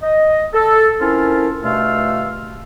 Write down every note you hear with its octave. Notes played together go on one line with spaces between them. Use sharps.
D#5
A4
C4 C#4 E4 F4 A4 A#4
G2 B2 A3 F4 F5 E6